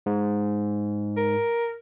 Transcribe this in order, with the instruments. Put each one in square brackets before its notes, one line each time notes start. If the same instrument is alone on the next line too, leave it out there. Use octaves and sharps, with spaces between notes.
[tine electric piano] G#2
[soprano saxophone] A#4